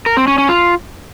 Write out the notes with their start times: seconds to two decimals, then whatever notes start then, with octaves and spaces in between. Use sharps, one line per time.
0.06 A#4
0.17 C4
0.27 C#4
0.38 C#4
0.49 F4